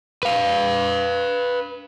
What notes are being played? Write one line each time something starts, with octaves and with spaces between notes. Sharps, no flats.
B4 F5